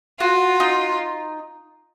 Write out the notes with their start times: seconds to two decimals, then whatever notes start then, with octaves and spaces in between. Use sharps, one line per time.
0.20 F4 F#4
0.60 D#4